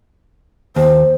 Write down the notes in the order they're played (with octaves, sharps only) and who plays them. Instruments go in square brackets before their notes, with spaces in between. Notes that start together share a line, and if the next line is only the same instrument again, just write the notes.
[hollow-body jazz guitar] D#2 [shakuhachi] C5